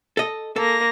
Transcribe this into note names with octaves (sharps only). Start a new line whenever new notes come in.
A4 D#5
A#3 A4 A#6